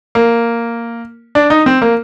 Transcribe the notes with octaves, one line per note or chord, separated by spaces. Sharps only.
A#3
D4
D#4
C4
A#3